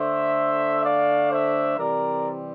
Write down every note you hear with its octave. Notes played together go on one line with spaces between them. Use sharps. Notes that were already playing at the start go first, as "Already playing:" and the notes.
Already playing: D3 A3 D4 C5 E5
D5 F5
C5 E5
C3 E3 G3 C4 A#4 D5